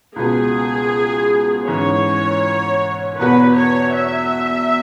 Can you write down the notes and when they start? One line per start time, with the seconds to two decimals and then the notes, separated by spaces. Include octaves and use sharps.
0.16 C#2 B2 B3 G#4
1.67 G#2 E3 C#4 C#5
3.19 E2 B2 B3 F#4 B4
3.57 C#5
3.95 E5